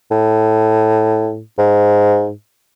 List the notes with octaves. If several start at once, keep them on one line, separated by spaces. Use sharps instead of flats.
A2
G#2